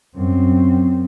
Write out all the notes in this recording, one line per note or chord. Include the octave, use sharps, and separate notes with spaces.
F#2 C4